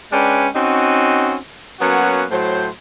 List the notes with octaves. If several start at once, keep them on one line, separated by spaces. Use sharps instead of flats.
G#3 C#4 D4 B4 G5
C4 C#4 D#4 F#4
F#3 A#3 B3 C#4 F#4
A2 F#3 C5